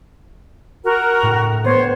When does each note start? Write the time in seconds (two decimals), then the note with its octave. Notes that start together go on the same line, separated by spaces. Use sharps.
0.84 F#4 A#4
1.23 A2
1.64 B3 C5 C#5